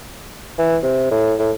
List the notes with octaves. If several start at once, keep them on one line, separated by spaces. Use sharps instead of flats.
E3
C3
A2
A2